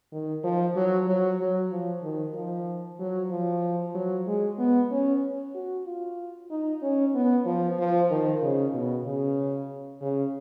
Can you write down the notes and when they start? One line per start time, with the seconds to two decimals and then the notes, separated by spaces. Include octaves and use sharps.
0.12 D#3
0.44 F3
0.76 F#3
1.07 F#3
1.39 F#3
1.71 F3
2.03 D#3
2.35 F3
2.99 F#3
3.31 F3
3.95 F#3
4.27 G#3
4.58 B3
4.91 C#4
5.55 F#4
5.86 F4
6.51 D#4
6.82 C#4
7.14 B3
7.46 F3
7.79 F3
8.10 D#3
8.42 C#3
8.74 B2
9.06 C#3
10.02 C#3